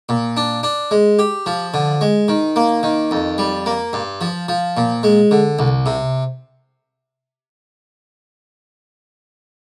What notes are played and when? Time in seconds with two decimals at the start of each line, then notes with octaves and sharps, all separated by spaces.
0.09 A#2
0.37 D4
0.63 D4
0.91 G#3
1.19 G4
1.46 F3
1.74 D3
2.01 G#3
2.28 D#3
2.56 A#3
2.83 D#3
3.11 F2
3.38 G3
3.66 A#3
3.93 G2
4.21 F3
4.49 F3
4.77 A#2
5.03 G#3
5.31 D3
5.59 C2
5.86 C3